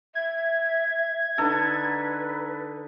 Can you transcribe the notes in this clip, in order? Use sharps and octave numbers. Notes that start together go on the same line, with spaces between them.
E5 G#6
D3 D#4 A4 B4